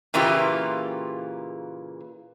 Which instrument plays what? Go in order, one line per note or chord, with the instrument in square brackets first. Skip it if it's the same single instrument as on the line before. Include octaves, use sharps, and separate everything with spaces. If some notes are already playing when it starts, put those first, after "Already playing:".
[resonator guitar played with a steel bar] A#2 C#3 E3 A#3 F4 G4